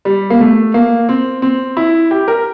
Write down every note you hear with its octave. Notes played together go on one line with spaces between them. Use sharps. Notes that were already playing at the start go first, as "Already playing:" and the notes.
G3
A#3
A3
A#3
C4
C4
E4
G4
A#4